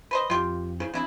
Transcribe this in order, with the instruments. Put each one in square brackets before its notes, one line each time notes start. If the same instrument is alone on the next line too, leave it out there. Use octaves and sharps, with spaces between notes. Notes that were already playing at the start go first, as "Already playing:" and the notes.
[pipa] B4 C5 D#5
[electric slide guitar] F2 [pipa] F4 G4
[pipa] C#3 [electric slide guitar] E4 G#4 C5
[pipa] C#3 E4 [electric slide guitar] E3 C4 D4